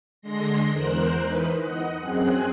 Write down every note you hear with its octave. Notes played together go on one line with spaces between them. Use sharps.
D3 G#3 C6 A#6
E2 A#4 C5 F#6
E3 D#4 B4
D#5 F#5
F#2 C4 G#4 F#6